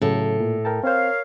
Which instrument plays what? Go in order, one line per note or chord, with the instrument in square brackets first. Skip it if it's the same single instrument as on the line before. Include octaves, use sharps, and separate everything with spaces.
[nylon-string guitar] A2 A4 [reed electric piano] C#3 F#3
[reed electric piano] A#2
A#4 G5 A5
[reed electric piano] C4 C5 [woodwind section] A#4 C#5 F5